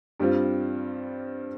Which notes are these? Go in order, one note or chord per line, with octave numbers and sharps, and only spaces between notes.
G2 G3 C4 F4